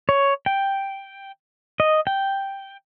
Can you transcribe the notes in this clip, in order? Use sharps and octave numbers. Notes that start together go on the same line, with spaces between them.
C#5
G5
D#5
G5